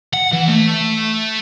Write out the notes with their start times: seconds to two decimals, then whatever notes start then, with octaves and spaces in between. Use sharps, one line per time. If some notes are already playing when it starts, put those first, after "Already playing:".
0.13 F#5
0.32 E3
0.48 A3